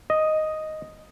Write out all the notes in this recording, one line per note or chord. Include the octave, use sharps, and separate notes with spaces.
D#5